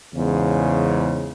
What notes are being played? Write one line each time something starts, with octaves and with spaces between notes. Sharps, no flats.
E2 G#2 C#3